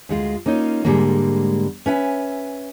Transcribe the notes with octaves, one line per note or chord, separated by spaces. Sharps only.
D2 G#3 F4
A#3 C#4 D#4 F4
G#2 D3 G3 G#3 A#3
C#4 B4 E5 F#5 G#5